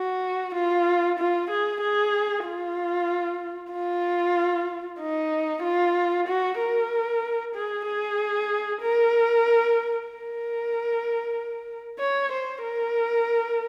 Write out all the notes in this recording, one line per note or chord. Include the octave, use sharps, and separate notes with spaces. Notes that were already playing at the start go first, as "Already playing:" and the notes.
Already playing: F#4
F4
F4
G#4
G#4
F4
F4
D#4
F4
F#4
A#4
G#4
G#4
A#4
A#4
C#5
C5
A#4